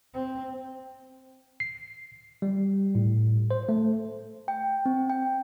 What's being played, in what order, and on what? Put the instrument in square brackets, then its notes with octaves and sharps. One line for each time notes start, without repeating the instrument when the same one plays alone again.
[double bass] C4
[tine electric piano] C7
G3
A2
C5
A3
[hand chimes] G5
C4
G5